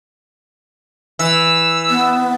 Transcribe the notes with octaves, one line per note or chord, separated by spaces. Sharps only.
E3 E6
B3